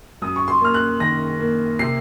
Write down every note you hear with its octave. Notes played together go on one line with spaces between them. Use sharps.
F#2 D#6
C#6
C6
A#3 F6
F#6
D#3 A#6
A#3
C3 C7